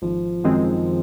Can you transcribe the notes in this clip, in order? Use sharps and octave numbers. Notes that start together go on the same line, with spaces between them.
G#1 F3
F#2 D#3 G#3 C4